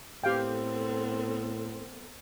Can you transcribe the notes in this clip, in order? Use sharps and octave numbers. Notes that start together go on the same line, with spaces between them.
A2 B3 C4 G4 A4 A#4 F5 G5